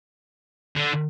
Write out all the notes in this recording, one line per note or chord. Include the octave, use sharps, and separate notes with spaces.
D3